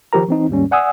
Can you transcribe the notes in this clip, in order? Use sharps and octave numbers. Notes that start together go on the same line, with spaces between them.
D#3 F3 G4 A#4 A#5
E3 C4 D#4
D#2 G#2 G3 C#4
D5 F#5 G#5 D#6 E6